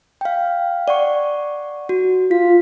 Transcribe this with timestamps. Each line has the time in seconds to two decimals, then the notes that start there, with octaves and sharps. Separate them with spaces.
0.21 F5 G5
0.88 D5 F#5 C#6
1.89 F#4
2.31 F4 B6